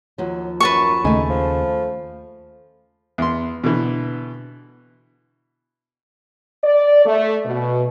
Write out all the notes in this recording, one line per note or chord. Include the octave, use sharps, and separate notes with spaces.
D#2 F3 F#3
F#2 B4 A5 C#6
D#2 C#3 A3 D#4 G#5
F3
E2 C6
B2 D3 E3
D5
A3
B2